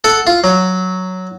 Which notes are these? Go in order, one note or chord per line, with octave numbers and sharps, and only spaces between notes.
A4 F#5
F4
F#3